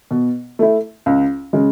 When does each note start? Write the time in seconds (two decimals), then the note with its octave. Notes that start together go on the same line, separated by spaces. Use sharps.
0.11 B2
0.59 A3 E4
1.06 C#2
1.53 C#3 G#3